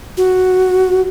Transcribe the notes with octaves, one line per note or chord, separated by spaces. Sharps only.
F#4